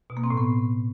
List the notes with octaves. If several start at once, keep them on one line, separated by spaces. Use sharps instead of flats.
B2
A#3
C4
A2
B3